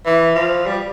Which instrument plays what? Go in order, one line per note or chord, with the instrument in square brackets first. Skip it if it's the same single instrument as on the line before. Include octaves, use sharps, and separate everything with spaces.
[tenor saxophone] E3
F3
G3